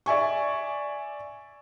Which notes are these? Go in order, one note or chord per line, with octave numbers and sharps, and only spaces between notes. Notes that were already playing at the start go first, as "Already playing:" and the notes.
D5 E5 G#5 C#6